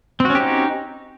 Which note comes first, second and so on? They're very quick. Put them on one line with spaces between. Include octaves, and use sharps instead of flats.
C4 F#4 C#4 G4 D#4